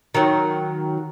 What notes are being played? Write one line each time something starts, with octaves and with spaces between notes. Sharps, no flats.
D#3 F#3